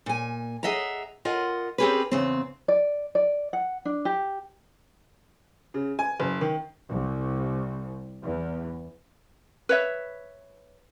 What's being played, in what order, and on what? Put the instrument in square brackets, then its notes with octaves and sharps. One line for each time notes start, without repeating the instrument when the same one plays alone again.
[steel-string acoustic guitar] A#2 G#5
G#4 A4 D#5 E5 F#5 A#5
F4 A#4 D#5 F#5
C4 C#4 G4 G#4 A#4 B4
E2 C#3 C4
[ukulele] D5
D5
F#5
D4
G4
[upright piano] C#3
G#5
F#1
D#3
[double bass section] C2
E2
[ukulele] B4 C#5 E5